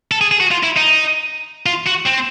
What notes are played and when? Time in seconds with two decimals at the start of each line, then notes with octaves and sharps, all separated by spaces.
0.11 A4
0.21 G#4
0.31 G#4
0.40 F#4
0.51 F4
0.63 E4
0.76 D#4
1.66 F4
1.86 F#4
2.06 C4